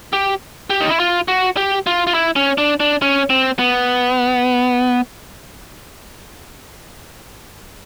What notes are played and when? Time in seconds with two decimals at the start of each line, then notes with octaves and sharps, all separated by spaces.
0.13 G4
0.70 G4
0.80 D#4
0.90 E4
1.00 F4
1.28 F#4
1.57 G4
1.87 F4
2.07 F4
2.14 E4
2.36 C#4
2.58 D4
2.80 D4
3.02 C#4
3.30 C4
3.59 B3